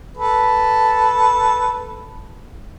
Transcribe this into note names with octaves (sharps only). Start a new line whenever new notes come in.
A4 B4